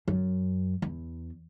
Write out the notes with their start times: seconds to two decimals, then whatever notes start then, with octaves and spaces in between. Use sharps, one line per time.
0.08 F#2
0.82 E2